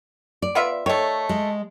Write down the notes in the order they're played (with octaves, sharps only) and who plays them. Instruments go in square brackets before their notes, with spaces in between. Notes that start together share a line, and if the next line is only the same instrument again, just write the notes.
[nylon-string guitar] D5
[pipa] B3 F4 E5
[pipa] D#3 A3 [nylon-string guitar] C#5
[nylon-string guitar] G#3